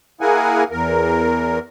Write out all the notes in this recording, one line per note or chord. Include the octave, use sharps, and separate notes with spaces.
A#3 E4 G#4 A#4 F#5 G#5
E2 A#4